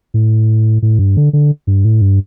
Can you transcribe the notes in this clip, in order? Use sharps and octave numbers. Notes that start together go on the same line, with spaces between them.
A2
A2
G2
D3
D3
G2
A2
G2